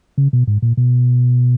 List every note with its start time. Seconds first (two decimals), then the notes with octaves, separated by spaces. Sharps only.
0.18 C#3
0.33 B2
0.47 G#2
0.62 A#2
0.77 B2